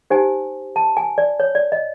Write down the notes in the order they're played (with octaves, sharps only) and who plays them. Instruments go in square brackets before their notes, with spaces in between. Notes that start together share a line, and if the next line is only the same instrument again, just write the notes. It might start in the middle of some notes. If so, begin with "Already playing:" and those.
[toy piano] D#4 G4 C5 G#5
A5
G#5
D5
C#5
D5
D#5